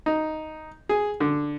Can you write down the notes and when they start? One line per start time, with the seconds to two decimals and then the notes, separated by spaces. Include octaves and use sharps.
0.06 D#4
0.89 G#4
1.20 D3